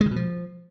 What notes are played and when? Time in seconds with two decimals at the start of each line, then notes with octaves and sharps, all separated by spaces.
0.01 G#3
0.06 D#3
0.11 B2
0.16 F3